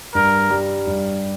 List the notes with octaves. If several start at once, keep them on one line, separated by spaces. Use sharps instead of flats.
G2 A#4
G3
G2